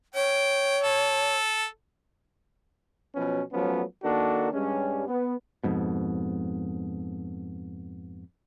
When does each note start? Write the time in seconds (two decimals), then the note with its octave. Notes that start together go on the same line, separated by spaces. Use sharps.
0.15 C#5 G5
0.83 A4
3.15 B2 F3 F#3 B3 C#4
3.53 F3 F#3 A3 B3 C#4
4.03 D#3 A#3 D4 F#4 A4
4.53 G2 G3 G#3 C#4
5.07 B3
5.64 F2 G#2 B2